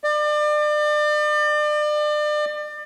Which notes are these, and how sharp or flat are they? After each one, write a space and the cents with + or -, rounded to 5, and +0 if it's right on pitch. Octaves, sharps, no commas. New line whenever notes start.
D5 +35